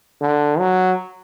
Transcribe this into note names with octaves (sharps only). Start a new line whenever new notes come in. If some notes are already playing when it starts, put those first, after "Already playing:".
D3
F#3